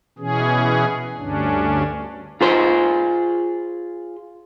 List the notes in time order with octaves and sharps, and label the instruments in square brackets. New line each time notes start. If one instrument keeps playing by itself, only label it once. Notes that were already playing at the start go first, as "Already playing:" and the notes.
[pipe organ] B2 E3 C#4 G#4
D2 G2 C#4 D4
[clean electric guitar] F4 G#4 C5